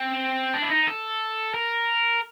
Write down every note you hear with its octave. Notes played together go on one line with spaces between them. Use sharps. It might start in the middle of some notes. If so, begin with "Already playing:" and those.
Already playing: C4
D4
E4
D#4
A4
A#4